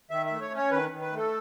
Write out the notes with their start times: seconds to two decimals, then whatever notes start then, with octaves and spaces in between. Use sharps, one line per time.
0.11 D#3 E5
0.26 A3 E5
0.41 C#5
0.51 C#4
0.57 C#5
0.71 D#3 B4
0.91 D#3
1.01 B4
1.12 A3 A4